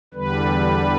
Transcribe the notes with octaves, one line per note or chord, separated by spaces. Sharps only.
E2 D3 G3 B4